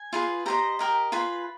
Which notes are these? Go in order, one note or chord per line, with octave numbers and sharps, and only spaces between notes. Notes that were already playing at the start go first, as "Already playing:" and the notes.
Already playing: G#5
F4 G#4 B4
G4 C5 D#5 A#5
G4 A#4 D#5
F4 G#4 B4 B5